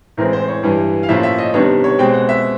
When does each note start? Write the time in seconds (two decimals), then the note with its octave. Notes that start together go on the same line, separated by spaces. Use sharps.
0.17 A2 E3 G#3 C4 A#4
0.33 C5
0.48 C#5
0.63 G2 E3 G3
1.03 F5
1.09 A2 F3 A#3 C#4 E5
1.23 E5
1.38 D#5
1.54 C3 D#3 G3 B3 D4 C#5
1.84 C#5
1.99 B2 G#3 C4 G5
2.14 F#5
2.29 E5